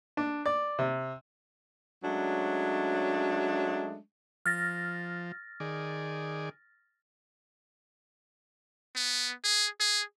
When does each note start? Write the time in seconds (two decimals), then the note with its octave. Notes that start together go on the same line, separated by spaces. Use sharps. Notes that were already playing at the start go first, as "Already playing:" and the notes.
0.17 D4
0.46 D5
0.79 C3
2.03 F#3 G#3 A3 C#4 D4
4.46 F3 F6 A6 A#6
5.60 D#3 G#4 D5
8.96 B3
9.44 G#4
9.80 G#4